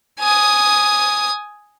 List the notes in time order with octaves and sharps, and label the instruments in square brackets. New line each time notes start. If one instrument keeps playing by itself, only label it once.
[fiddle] G#5 D#6